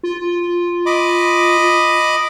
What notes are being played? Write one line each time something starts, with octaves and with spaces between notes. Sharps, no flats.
F4
D#5 B5 D6